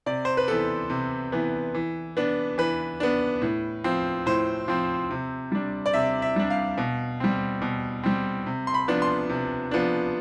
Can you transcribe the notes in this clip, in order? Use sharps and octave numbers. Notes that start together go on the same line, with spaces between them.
C3 D5
C5
B4
E3 B3 A4
C3
E3 B3
E3
B3 D4
E3 B4
B3 D4
A2
F3 C4
A2 C5
F3 C4
C3
G3 D4
D5
C3 E5
E5
G3 D4
F5
B2
G3 C4
B2
G3 C4
C3
C6
B5
F3 B3 D4
C6
C3
F3 B3 D4